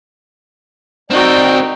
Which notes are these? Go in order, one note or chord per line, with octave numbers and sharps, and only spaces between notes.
C4 D#4 F#4 A#4 D5 G5